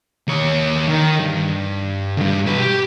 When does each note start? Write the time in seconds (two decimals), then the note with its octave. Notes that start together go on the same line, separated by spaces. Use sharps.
0.27 D#2 C#5
0.88 D#3
1.19 G2
2.17 D2 G2
2.45 B1 B4
2.60 G4